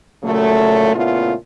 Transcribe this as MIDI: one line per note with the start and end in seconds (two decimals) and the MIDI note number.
0.24 0.92 46
0.24 0.92 49
0.24 0.92 54
0.24 0.92 57
0.95 1.33 46
0.95 1.33 49
0.95 1.33 57
0.95 1.33 59
0.95 1.33 64
0.95 1.33 65